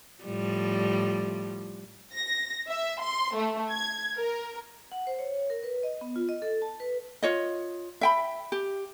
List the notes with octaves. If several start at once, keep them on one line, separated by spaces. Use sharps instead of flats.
A2 F3 G3
A#6
E5
C6
A3
G#6
A#4
F#5
C5
C#5
A#4
B4
D#5
B3
F4
D#5
A4
A5
B4
F4 C#5 D#5
E5 G5 B5
G4